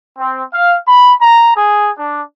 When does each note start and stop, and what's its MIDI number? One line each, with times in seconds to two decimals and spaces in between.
0.18 0.42 60
0.53 0.75 77
0.88 1.14 83
1.20 1.52 82
1.56 1.88 68
1.97 2.21 62